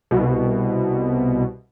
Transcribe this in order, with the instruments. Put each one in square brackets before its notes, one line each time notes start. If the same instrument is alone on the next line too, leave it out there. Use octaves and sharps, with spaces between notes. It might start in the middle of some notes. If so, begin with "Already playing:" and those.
[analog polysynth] C2 B2